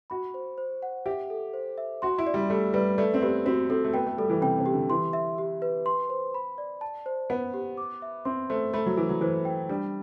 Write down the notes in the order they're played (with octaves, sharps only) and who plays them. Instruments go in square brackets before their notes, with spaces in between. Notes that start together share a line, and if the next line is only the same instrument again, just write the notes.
[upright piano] F#4 [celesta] B5
[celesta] C5
C5
F#5
[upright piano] G4 [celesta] E5
[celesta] A4
C5
E5
[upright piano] F#4 [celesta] C6
[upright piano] E4
[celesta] D5
[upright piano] G3
[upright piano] A3 [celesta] G4
[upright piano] G3 [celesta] B4
[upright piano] A3 [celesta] D5
[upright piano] C4
[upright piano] B3 [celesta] G4
[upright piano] C4 [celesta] F#4
[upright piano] C4 [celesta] A4
[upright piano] A3
[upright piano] B3 [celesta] G5
[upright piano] A3
[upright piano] G3 [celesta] A4
[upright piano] E3
[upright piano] C3 [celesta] G5
[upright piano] C3
[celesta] G4
[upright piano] D3
[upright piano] E3 [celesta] C6
[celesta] E5
G4
B4
C6
C5
B5
D5
A5
C5
[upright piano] B3 [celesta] F#5
[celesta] G4
D6
E5
[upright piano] C4 [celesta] C6
[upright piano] A3 [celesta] C5
[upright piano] A3 [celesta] B5
[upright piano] F#3
[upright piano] E3 [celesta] A4
[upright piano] F#3
[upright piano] E3 [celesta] C5
[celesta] G5
[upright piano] G3 [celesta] D4